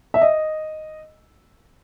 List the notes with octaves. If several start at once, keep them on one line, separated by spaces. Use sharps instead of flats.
E5
D#5